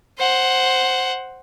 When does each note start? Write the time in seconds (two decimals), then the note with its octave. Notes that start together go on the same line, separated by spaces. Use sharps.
0.19 C5 F#5